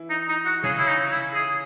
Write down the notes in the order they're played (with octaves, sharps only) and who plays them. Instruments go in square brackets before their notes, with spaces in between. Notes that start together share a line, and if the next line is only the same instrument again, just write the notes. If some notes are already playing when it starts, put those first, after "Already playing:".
Already playing: [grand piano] E3 E4
[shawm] D#4
D#4
F#4
[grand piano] C#3 C#4 [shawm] G#4
[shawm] E4
D#4
E4
G#4